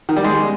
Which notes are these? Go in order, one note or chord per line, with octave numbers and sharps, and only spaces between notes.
D#3
G3
G#3